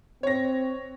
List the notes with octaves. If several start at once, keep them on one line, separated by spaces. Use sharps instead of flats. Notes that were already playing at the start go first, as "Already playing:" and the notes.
C4 C#5 A#6